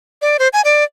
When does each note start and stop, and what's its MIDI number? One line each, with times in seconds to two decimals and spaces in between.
0.22 0.37 74
0.39 0.48 72
0.53 0.62 80
0.65 0.84 74